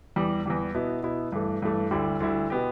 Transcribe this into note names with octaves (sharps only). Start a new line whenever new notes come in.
E2 E3 G3
E2 E3 G3
B2 B3 E4
B2 B3 E4
G2 E3 A3
G2 E3 A3
D2 D3 G3 E4
D2 D3 G3 E4
B2 B3 G4